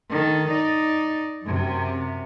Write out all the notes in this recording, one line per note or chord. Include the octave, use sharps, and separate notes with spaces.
D#3 A4
D#4 D5
F#2 C3